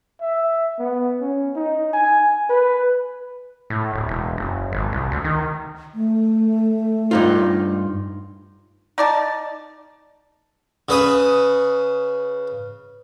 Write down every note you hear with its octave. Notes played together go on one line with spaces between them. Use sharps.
E5
B3
C#4
D#4
G#5
B4
A2
D1
E1
F#1
G#1
C2
D2
D#3
A3
G2 D#4 F4
D#4 D5 A5
C#3 B4 D#6